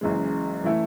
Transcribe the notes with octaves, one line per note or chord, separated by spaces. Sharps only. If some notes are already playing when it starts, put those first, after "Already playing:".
F#1 F#2 E3 G#3
E3 A3 E4